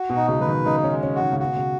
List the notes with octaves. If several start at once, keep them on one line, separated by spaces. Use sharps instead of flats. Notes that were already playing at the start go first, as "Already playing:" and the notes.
Already playing: F#4
B2
D#4
C#3
F#3 B4
D#3
C#3 D#4
C#4
G#3
C#4
F#4
D#3
C#3
B2 F#4
C#3